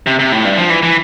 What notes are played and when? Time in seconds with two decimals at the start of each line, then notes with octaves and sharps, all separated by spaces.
0.07 C3
0.19 C3
0.32 A2
0.45 G2
0.58 F3
0.70 E3
0.83 E3